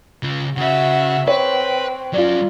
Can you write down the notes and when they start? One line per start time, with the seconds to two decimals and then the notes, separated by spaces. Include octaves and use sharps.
0.23 C#3 F4
0.58 C#3 C#4 F#4 E5
1.28 C4 B4 C#5
2.13 F#3 C#4 F4 D5